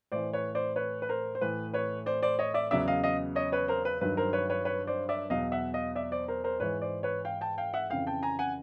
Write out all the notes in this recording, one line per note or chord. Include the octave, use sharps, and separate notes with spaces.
A2 E3 C5 D5
B4 C#5
C5 D5
B4 C#5
B4
A#4 C5
C5
A2 E3 B4
B4 C#5
C5 D5
C5 D5
C#5 D#5
D5 E5
E2 C#3 F#3 D5 E5
D#5 F5
D#5 F5
C#5 D#5
B4 C#5
A#4 C5
B4
G2 D#3 F#3 B4
A#4 C5
B4 C#5
B4 C#5
B4 C#5
C5 D5
D5 E5
E2 B2 F#3 D#5 F5
E5 F#5
D#5 F5
D5 E5
C5 D5
A#4 C5
A#4 C5
G#2 E3 B4 C#5
C5 D5
B4 C#5
F5 G5
G5 A5
F5 G5
E5 F#5
F2 C#3 E3 F5 G5
G5 A5
G#5 A#5
F#5 G#5